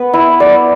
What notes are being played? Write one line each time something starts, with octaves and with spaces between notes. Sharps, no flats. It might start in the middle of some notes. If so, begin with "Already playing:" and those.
Already playing: B3 B4
E4
D5